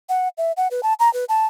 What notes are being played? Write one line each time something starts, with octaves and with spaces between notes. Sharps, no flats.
F#5
E5
F#5
B4
A5
A#5
B4
A5